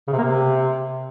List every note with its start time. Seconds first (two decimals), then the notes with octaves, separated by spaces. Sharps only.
0.07 C#3
0.13 C3
0.18 A#3
0.23 C3